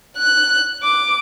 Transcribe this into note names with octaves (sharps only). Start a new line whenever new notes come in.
F#6
D6